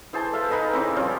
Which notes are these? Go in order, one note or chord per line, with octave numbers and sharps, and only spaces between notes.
E3 G#4 C5 A5
A4 E5 F5
D#4 B4 D#5 G#5
C#3 E3 C4
F3 G3 C#4 F4